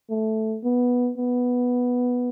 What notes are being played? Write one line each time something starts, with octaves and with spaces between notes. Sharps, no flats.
A3
B3
B3